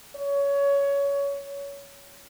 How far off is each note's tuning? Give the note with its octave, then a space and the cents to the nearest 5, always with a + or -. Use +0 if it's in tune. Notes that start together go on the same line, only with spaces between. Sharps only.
C#5 +20